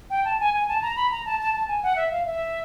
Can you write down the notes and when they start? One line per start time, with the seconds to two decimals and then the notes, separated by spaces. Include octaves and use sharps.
0.10 G5
0.25 A5
0.40 G#5
0.54 G#5
0.68 A5
0.82 A#5
0.96 B5
1.11 A#5
1.25 A5
1.40 A5
1.54 A5
1.68 G#5
1.83 F#5
1.96 E5
2.11 F5
2.26 E5